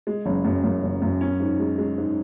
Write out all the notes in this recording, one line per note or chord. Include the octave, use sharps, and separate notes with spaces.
G#3
F#1
F#2
F#2
F#1
F#2
C#4
G#2
G#3
G#3
G#2